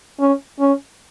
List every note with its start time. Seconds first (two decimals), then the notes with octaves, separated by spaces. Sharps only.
0.20 C#4
0.60 C#4